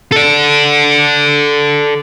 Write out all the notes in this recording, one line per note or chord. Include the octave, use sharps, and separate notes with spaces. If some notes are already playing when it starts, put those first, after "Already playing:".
A4 D5